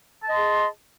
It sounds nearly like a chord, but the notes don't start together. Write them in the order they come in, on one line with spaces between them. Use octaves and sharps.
A5 D#5 C6 G#4